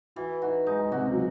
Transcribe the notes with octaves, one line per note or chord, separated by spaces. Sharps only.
E3 F#4
D#4 F#4
G#3 D#4
G#3
C3 F#4
C#3
F#3